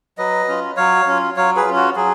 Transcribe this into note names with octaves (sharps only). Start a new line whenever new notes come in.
F#3 B4 D#5
C#4 F4
F#3 C#5 F5
C#4 F4
F#3 C#5 F5
G#4 B4
C#4 F4
F#4
F#3 G#4